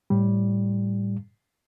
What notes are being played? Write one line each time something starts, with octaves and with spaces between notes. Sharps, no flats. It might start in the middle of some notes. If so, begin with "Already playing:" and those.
A2 G3